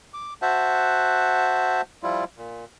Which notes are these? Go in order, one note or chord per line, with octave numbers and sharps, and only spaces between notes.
D6
F#4 C5 E5 F#5 A5
F3 G3 E4 F4
A#2